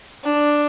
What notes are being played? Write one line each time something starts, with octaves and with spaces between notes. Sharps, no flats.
D4